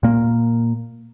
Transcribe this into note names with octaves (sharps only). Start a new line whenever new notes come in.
A#2 A#3